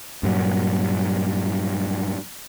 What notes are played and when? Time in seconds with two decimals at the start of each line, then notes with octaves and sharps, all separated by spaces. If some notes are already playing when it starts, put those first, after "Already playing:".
0.23 G2 A#2 F#3